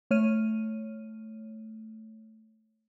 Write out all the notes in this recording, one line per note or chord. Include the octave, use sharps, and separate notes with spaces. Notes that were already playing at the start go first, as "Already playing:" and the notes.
A3 C#5 F6 D#7